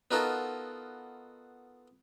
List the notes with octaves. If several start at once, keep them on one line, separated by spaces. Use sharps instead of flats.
B3 D#4 F4 F#4 A4 A#4